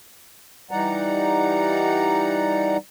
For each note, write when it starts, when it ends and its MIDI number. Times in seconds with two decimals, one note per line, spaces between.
0.71 2.77 52
0.71 2.77 55
0.71 2.77 63
0.71 2.77 74
0.71 2.77 78
0.71 2.77 82